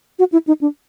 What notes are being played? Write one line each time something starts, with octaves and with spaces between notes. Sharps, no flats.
F#4
E4
D#4
D4